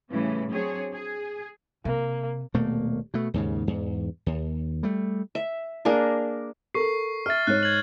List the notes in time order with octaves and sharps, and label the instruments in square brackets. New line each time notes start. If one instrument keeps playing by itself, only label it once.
[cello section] A2 C#3 E3 G3 A3
F#3 C4 D4 G#4 C#5
G#4
[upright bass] C3 [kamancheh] A#3
[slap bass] D#1 B2 A3 A#3
B2 A3
D#2 G#2 C#3
E2 G#2
D#2
G3 A3
[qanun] E5
A#3 D4 G#4 A#4
[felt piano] A4 A#4 [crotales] C#6 C7
[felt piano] E5 [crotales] F6 A6
[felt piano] G#2 C#5 [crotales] F#6
[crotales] G#6 F#7